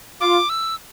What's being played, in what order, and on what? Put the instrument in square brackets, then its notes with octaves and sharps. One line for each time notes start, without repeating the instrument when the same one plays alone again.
[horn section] F4 [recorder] D6
[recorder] E6